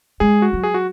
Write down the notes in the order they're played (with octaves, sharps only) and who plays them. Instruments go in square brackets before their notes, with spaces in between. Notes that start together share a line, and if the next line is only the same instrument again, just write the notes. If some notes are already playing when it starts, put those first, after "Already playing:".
[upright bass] G#3 [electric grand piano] G#4
[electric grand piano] F#4
[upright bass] F#3
[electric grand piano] G#4
F#4